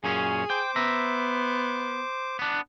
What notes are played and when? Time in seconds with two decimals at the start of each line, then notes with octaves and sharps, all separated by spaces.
0.04 F#2 A#2 C#4 G#4
0.50 C5 G5 D6
0.76 B3 E5 A#5
2.39 B3 D4